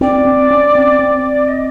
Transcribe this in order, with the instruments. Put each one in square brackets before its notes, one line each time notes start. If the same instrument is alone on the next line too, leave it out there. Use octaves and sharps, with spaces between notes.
[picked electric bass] C4 [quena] D5
[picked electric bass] C4
C#4
C4
C4
[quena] D#5